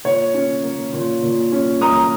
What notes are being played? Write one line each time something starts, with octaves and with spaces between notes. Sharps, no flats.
A#2 C#5
C#4
A#3
A#2
A#2
C#4
A#3 A#5 D#6